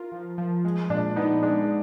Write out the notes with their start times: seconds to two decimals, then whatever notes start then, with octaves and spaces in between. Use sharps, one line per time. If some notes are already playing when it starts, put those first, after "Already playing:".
Already playing: F4 A#4
0.12 F3
0.38 F3
0.65 G#3
0.90 A#2 D4
1.16 B3 D#4
1.43 G#3 D4